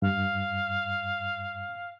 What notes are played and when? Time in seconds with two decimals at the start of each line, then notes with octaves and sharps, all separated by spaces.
0.02 G2 F5